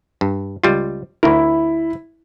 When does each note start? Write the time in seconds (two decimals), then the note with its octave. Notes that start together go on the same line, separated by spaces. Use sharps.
0.21 G2
0.64 C#2 G3 F4
1.23 D2 E4 A#4